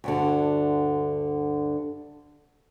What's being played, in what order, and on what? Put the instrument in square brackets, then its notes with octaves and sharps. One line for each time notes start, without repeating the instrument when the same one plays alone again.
[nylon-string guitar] D2 G2 D3